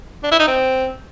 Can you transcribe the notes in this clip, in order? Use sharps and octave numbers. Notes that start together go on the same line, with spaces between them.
D4
E4
D#4
C4